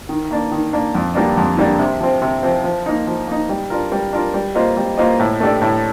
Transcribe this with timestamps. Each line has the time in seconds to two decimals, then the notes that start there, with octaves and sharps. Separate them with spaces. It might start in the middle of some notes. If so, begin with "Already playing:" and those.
0.09 D#3
0.31 A#3 D4
0.51 D#3
0.73 A#3 D4
0.95 F2
1.15 D3 G3 A#3 D4
1.37 F2
1.57 D3 G3 A#3 D4
1.79 C3
2.00 F3 C4
2.22 C3
2.43 F3 C4
2.64 F3
2.86 A#3 D#4
3.07 F3
3.28 A#3 D#4
3.49 G3
3.70 D4 F4 A#4
3.92 G3
4.13 D4 F4 A#4
4.34 G3
4.55 A#3 F4 C5 D#5
4.77 G3
4.98 A#3 F4 C5 D#5
5.20 A2
5.40 A3 D4 G4 D5
5.62 A2